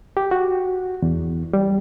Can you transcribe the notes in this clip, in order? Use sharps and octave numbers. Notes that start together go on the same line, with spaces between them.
G4
F#4
E2
G3